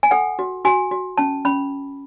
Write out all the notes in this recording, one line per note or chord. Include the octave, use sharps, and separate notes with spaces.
G#5
A4 F#5
F#4
F#4 G#5
F#4
C#4 A5
C#4 B5